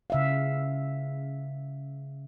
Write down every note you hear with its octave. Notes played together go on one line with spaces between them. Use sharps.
C#3 E5 F5